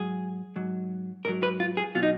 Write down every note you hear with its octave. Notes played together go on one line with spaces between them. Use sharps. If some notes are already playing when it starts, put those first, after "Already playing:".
Already playing: G#2 F#3 G#4
G#2 F#3
G#2 F#3 A#4
B4
F4
G#4
B2 F#3 F4
D#4